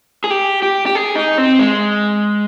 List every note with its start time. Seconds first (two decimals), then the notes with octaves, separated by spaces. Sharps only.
0.24 G#4
0.30 G4
0.62 G4
0.86 G4
0.95 G#4
1.16 D#4
1.38 C4
1.59 G#3